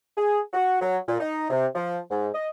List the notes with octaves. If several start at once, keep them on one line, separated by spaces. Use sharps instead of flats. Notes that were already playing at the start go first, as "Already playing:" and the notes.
G#4
F#4
F#3
A#2
D#4
C3
F3
G#2
D#5